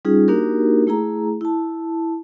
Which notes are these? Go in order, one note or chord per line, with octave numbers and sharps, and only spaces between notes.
G3 C#4 D#4 F4 G#4
A#3 D4 D#4 F#4 G4 A#4
A3 E4 G#4 A#5
E4 A5